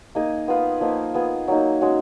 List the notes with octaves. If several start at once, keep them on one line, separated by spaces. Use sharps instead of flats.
A#3 D#4 G#4 D#5
B3 F4 B4 F5
F3 A#3 D#4
B3 F4 G#4
F#3 A#3 D#4
G#3 C#4 F#4